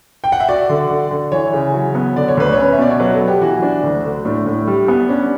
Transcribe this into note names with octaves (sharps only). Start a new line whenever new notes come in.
G5
F#5
E5
F#4 D5
D3
D3
D3
E3 C#5
C#3
F#3
B3
D3 D5
C#5
D2 B4
C#4 C#5
E5
B2 D5
C#5
F#3 B4
A4
F#3
G4
E3 F#4
D4
D2
D3
A2 D4
A2
G3
B3
C#4 D4